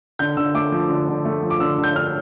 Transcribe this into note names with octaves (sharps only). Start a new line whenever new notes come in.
D3 G6
D3 E6
A3 D6
F3
D3
D3
A3
F3
D6
D3 E6
D3
G6
D4 F6